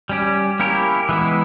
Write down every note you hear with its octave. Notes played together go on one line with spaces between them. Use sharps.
G3 C#4 G4
A#3 C#4 E4 G4 A#4
E3 G#3 B3 E4